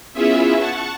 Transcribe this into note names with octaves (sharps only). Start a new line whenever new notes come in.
B3 C#4 E4 F4 G#4 E5
F#5 A5 C#6